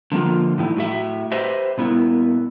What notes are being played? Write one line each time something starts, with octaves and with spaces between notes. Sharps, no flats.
D3 F3 A#3 F4
A2 E3 D#4 E4
A2 F#4 E5
G4 B4 C5 D#5 E5
A#2 B3 E4